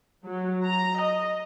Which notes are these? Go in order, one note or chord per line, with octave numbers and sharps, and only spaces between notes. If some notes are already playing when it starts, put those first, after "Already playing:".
F#3
A#5
D#5